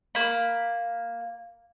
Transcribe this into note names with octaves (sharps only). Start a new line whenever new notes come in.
A#3 B5